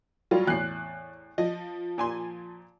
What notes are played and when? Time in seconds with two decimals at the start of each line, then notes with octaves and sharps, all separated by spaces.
0.31 F#3 G3 F4
0.47 E2 A2 F#6 C7
1.38 F3 D#5
1.98 A#2 G#5 C6